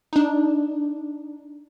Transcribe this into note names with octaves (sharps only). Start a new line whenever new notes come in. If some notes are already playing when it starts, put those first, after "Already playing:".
D4 D#4